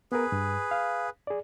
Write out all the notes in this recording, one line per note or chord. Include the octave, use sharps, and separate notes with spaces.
B3 G#4 A#4 B4
G2
F5
G#4 D5